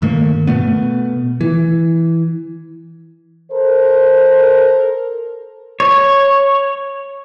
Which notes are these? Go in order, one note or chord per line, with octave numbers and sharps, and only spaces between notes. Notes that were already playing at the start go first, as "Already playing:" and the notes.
G2 D#3 A3 A#3
B2 A3 B3
E3
A4 A#4 C5
C#5